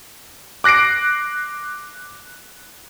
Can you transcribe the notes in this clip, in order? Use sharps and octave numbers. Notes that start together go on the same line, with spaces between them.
D6 F#6 A#6 C7 D7